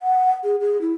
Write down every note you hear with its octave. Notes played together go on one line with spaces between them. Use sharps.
F#5
G#4
G#4
E4